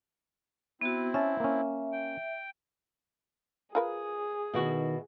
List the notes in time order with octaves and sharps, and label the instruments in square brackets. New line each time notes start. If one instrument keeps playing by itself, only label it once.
[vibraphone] B3 F#4 [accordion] C4 E4
[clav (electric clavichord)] C#4 A5 [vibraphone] E5
[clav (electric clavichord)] A#3 C#4
[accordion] G5
[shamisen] F4 A#4 B4 [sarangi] G#4
[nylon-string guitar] B2 E4 F#4 [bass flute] D#3